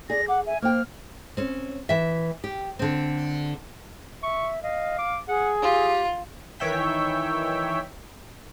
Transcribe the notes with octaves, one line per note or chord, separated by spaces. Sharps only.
G#4 D5 A#6
F#5 D6
E5 G#5
A#3 C5 G5 F6
C4 C#4
E3 E5
G4
D3 C4
E5 C#6
D#5 F5
D6
G#4 F#5
F4 G4
D#3 E3 C#5 E5 G5 B6